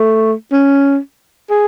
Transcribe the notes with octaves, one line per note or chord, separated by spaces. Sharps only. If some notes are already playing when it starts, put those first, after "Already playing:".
Already playing: A3
C#4
G#4